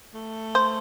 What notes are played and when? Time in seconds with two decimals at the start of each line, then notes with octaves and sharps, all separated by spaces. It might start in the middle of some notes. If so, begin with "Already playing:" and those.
0.14 A3
0.55 C5